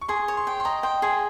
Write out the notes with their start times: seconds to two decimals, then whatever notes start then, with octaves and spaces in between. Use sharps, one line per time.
0.01 C#6
0.08 G#4 C6
0.28 C#5
0.37 C6
0.47 G5
0.60 C6
0.65 D#5 A#5
0.83 G5 C6
1.02 G#4 C6